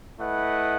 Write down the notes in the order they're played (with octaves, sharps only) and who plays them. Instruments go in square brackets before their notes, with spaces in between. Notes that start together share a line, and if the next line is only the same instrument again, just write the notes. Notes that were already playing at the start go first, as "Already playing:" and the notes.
[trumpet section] A3 E4 B4 D#5 F#5